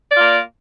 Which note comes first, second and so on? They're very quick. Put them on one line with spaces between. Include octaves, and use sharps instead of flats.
D5 F4 A#3